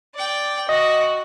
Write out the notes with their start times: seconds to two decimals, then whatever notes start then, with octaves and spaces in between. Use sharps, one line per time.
0.15 D5 G5
0.69 F#4 D#5